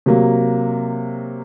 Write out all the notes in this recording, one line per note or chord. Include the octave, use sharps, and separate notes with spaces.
C3 F#3 A#3